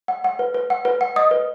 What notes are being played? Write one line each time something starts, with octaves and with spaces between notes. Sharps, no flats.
F#5
F#5
B4
B4
F#5
B4
F#5
D#5 D#6
B4